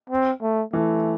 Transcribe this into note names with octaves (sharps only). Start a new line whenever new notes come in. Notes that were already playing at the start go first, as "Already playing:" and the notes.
C4
A3
E3 A3